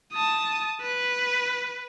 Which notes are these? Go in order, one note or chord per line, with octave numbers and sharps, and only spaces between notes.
A5 D#6
B4